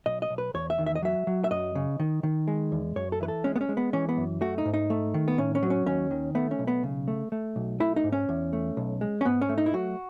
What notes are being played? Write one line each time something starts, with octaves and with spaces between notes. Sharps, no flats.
B1 D#5
D#5
B1
B4
E2 C#5
E5
D#3
E5
D#5
F#3 E5
F#3
E5
F#2 D#5
C#3
D#3
D#3
G#3
E2
F#2 C#5
A4
E3 B4
A4
G#3 C#4
B3
C#4
G#3
B3
E3 C#4
B3
F#2
A3 F#4
D#4
G#2
D#4
A3
D#3
B3
A2 C#4
C#4
F#3
C#4
D#2 C#4
D#3
A3 B3
C#4
B1
B3
C#3
A3
A3
B1
A3 E4
D#4
G#2
C#4
E2
A3
B1
G#3
C#4
G#2 B3
C#4
A3
D#4
E4
F#3 F#4